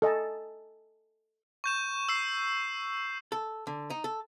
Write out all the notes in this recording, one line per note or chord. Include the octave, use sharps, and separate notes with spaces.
A4 D#5 G#5 A5
C#6 G6 E7
E6 C7
A4
D3
D#4
A4